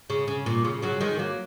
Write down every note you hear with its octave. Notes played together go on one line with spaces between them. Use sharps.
C#3
C#3
A#2
C#3
C#3 F#3
D#3 G#3
F#3 A#3